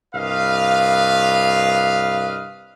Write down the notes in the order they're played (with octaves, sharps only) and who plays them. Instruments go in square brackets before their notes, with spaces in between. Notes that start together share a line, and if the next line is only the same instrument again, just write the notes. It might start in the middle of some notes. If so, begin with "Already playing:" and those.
[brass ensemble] C2 G2 B4 D#5 F5